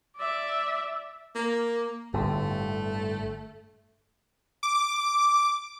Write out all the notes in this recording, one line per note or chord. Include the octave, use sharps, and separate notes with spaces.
D5 E5
A#3
G1 A2 D3 A3
D6